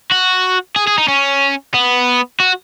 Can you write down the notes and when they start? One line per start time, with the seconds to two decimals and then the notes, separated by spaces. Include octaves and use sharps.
0.11 F#4
0.76 G#4
0.87 G#4
0.98 D#4
1.08 C#4
1.74 B3
2.40 F#4